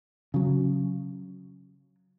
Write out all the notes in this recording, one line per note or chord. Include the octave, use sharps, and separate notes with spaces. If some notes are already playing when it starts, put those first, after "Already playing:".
C#3 F#3